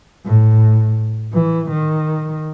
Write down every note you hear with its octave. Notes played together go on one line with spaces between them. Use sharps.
A2
E3
D#3